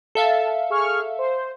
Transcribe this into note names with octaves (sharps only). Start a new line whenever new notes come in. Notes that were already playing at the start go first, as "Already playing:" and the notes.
A4 E5 F5 A5
G#4 C#6 F6
C5